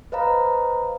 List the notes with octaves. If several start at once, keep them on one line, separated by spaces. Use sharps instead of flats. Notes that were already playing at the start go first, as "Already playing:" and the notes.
B4 C5 D#5 F5 A#5 B5